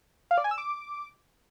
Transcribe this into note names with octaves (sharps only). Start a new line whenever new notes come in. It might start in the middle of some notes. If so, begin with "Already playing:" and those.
F5
D5
G#5
E6
D6